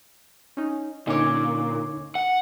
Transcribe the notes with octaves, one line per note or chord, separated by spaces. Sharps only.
C#4 D#4
A#2 D3 C#4 D#4 C#5 D6
F#5